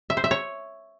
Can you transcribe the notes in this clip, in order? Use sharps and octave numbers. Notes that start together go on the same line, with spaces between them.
E5
C5
E5
C#5